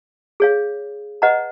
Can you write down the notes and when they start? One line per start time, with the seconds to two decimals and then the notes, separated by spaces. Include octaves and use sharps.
0.40 G#4 C#5 F5
1.22 B4 D#5 F#5 A#5